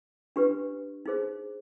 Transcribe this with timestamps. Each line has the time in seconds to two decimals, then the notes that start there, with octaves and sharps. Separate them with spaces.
0.36 D4 G4 B4
1.06 D#4 G#4 C5